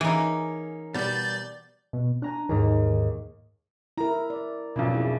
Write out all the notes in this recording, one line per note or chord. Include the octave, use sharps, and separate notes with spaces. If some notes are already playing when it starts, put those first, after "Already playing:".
E3 A#3 C#4 D#4 G#4
B2 G3 D5 G6 A6
B2
D4 G#5 A#5 F#6
D#2 G#2 D#3 A#4
E4 A#4 A#5
D5
B1 F2 B2 C#4 D4
E4 G#4